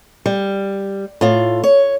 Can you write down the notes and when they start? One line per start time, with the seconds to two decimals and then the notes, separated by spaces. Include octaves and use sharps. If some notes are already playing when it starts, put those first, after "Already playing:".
0.26 G3
1.21 A2 F4
1.64 C#5